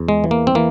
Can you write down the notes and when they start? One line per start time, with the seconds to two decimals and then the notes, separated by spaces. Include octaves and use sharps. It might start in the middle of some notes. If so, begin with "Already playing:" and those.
Already playing: E2
0.09 G#3
0.24 E3
0.31 A#3
0.47 C4
0.55 E3 A#3